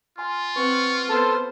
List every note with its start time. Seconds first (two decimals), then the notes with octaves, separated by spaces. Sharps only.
0.18 F4 G#5 C6
0.56 C4 B4 F#5 C#6
1.09 B3 A4 C5 A5 C6 G6